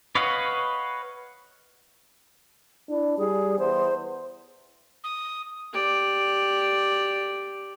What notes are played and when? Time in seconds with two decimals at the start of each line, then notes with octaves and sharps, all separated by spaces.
0.15 B4 C#5 D#5 F5 F#5
2.90 D4 E4
3.18 G3 G#4
3.59 E2 C5
5.04 D#6
5.73 G4 D5